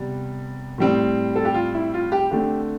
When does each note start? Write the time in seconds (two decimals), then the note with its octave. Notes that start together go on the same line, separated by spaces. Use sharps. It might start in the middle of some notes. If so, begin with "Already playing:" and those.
Already playing: C3 G3 B3
0.78 A2 G3 C4
1.35 A4
1.45 G4
1.54 F4
1.74 E4
1.94 F4
2.12 G4
2.31 D3 A3 C4 G4